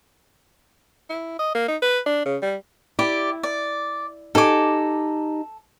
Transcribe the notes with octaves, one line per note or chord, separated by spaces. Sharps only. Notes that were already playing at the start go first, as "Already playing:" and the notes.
E4
D#5
A#3
D#4
B4
D4
C#3
G3
E4 G4 D5
D5
D#4 G4 A4 G#5 D6